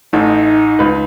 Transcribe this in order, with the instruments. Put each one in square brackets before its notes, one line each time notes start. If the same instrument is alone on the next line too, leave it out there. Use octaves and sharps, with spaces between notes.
[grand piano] A1 A2 A4 [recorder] D#4
[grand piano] C#2 B4